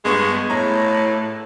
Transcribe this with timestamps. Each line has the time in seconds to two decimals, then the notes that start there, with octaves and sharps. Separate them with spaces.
0.05 G2 G#3 B3 C#6
0.50 A2 A#5